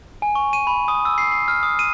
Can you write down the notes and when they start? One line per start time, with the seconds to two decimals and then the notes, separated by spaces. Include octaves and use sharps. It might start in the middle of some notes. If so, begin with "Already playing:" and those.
0.22 G#5
0.35 C#6
0.53 D#7
0.67 B5
0.88 D#6
1.05 E6
1.18 C7
1.32 C7
1.48 F6
1.63 D#6
1.79 D#7